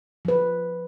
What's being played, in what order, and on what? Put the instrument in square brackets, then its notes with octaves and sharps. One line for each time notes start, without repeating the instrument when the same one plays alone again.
[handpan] F3 B4